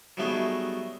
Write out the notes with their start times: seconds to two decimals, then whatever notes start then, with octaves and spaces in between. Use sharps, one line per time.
0.17 F#3 G3 A3 B3 D#4 G#4